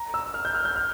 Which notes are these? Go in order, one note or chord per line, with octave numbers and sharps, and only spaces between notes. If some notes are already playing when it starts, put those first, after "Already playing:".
Already playing: A#5
E6
F6
G6
F6
G6
F6